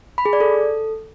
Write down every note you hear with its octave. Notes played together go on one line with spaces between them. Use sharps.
B5
G#4
D5
A4